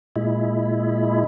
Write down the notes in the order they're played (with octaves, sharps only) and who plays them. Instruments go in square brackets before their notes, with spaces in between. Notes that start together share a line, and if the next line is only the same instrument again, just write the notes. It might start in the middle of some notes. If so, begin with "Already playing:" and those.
[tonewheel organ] A#2 G#3 E4